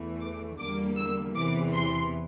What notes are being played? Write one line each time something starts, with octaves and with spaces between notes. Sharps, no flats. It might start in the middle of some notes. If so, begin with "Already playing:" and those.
Already playing: E2 E3 A3
D6
E2 D3 G3 A#3 D6
E6
E2 C3 E3 D6
C6